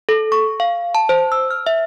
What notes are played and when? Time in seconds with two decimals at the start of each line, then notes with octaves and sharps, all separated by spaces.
0.09 A4
0.32 C#6
0.60 F5
0.95 A5
1.09 C5
1.32 E6
1.51 F6
1.67 E5